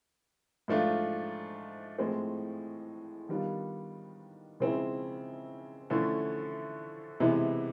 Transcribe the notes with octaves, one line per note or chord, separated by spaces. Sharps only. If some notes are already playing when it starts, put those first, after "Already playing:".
G#2 F3 A3 D4 F4
A2 F3 G#3 C4
D#3 G3 B3 D4 F4
C#3 F3 G#3 C4 E4
D3 F3 A3 C#4 E4
C3 E3 G#3 B3 E4